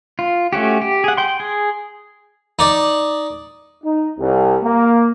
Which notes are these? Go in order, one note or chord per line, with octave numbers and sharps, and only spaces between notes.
F4
A3 C#4 F#4 G4
G4
G#4 F#5
G5 C6
G#4
D#4 D5
D#4
C2
A#3